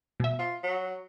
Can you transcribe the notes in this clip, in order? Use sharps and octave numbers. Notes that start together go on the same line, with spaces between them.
B2 E5
F4
F#3